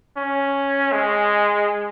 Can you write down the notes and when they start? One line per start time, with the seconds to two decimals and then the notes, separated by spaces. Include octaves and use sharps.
0.17 C#4
0.92 G#3